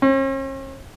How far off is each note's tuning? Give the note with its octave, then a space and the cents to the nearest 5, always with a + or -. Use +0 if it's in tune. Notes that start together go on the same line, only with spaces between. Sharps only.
C#4 -45